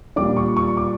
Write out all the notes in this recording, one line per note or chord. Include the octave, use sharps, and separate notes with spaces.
A#2 G3 D4 D6
C#6
C#6
D6